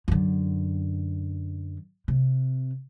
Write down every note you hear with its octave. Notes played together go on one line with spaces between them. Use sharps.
F#2 D3
C3